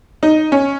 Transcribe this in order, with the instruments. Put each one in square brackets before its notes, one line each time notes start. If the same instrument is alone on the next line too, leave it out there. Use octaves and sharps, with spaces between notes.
[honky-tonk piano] D#4
C#4